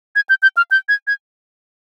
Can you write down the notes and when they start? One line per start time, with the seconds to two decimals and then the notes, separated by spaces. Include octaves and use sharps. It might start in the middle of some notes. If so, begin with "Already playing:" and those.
0.16 G#6
0.29 G6
0.42 G6
0.57 F6
0.71 G6
0.89 G#6
1.07 G#6